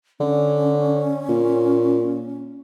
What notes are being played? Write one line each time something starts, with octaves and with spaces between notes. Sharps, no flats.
D3 C#4
A#2